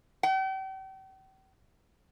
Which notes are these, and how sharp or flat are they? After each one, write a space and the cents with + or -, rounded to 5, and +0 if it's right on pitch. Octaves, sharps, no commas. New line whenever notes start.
G5 -40